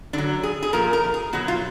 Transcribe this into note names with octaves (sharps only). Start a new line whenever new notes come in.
D3 F#3 D4
G#4
G#4
A#2 F3 A#4
A#4
G#4
B2 F#3 F#4
F4